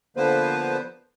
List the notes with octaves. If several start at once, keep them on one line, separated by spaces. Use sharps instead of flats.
D3 F3 A#3 B3 B4 C5